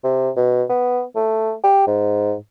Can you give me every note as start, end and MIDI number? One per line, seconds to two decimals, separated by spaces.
0.04 0.30 48
0.36 0.64 47
0.69 1.03 59
1.16 1.54 57
1.64 1.87 67
1.87 2.35 44